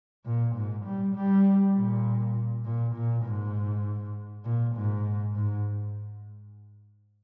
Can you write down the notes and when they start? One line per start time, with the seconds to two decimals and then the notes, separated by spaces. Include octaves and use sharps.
0.26 A#2
0.55 G#2
0.85 G3
1.15 G3
1.75 A#2
2.65 A#2
2.95 A#2
3.25 G#2
4.45 A#2
4.75 G#2
5.35 G#2